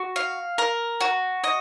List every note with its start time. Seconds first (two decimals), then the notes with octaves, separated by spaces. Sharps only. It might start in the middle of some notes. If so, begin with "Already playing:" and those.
Already playing: F#4
0.16 F5
0.58 A#4
1.01 F#4
1.44 D#5